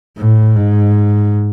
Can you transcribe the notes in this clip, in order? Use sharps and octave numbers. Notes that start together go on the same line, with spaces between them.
A2
G#2